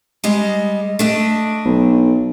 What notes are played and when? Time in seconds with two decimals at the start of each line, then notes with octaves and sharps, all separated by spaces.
0.24 G3 G#3 D#5
0.99 A3 D4 D#5
1.65 B1